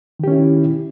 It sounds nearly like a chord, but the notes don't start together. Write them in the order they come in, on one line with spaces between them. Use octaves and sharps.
D#3 G4 C#4 E4